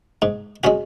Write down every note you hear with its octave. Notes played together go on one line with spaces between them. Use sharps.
G#2
G#3 C#4 F#4